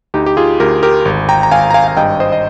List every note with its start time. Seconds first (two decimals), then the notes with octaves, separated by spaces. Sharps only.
0.14 D2 D#4 G4
0.26 G4
0.37 F4 G#4
0.60 D2 G4 A#4
0.83 G4 A#4
1.05 G#1
1.29 G5 A#5
1.43 A#5
1.51 G#1 F5 G#5
1.70 A#5
1.74 F5 G#5
1.88 F5
1.97 G2 D#5 G5
2.20 C5 D#5
2.32 D#5